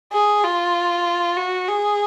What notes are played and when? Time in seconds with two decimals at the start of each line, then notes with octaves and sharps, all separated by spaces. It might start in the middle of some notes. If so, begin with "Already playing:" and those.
0.12 G#4
0.44 F4
1.37 F#4
1.68 G#4